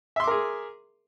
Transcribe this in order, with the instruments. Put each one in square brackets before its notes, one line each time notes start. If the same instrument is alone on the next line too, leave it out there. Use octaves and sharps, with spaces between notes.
[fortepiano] E5
C6
D6
A#4
G#4